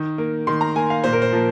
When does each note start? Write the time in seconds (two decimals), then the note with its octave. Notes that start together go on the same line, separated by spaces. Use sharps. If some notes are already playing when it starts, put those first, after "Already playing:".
Already playing: D#3
0.18 A#3
0.47 D#3 C6
0.61 A#5
0.76 A#3 G#5
0.90 F5
1.04 A#2 C5
1.13 A#4
1.22 C5
1.33 F3 A#3